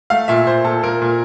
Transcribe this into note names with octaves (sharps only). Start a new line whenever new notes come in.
A3 F5
A#2 E5
A#2 C5
A#2 A4
A#2 A#4
A#2